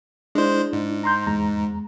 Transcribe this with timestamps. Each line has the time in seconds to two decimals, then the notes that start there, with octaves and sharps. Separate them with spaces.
0.35 G#3 D4 E4 C5
0.73 G#2
1.04 A#5 C6 G6
1.27 E2 G#3 A#5